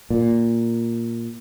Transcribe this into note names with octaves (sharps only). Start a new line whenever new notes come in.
A#2